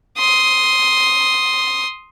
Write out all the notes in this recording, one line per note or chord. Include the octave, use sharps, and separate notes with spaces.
C6 D#6